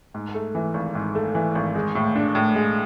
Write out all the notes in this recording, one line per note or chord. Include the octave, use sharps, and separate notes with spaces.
G#2
A3
E3
G#1
G#2
A3
E3
G#1
G#3
A2
D4
A2
G#3